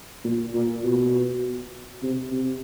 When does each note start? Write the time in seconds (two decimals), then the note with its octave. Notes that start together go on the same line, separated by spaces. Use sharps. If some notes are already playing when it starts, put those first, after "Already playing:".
0.24 A#2
0.54 A#2
0.84 B2
2.03 C3
2.32 C3